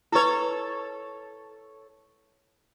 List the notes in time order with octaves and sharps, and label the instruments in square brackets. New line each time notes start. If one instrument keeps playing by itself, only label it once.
[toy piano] E4 B4 [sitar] A4 C#5